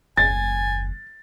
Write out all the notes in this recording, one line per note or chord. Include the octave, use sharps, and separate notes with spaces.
F#1 D#2 G#5 A6